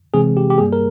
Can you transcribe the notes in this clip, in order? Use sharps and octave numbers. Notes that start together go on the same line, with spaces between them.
C3 E3 G#3 C4 G#4
G4
G4
G2 G3 A#3 G#4
A#4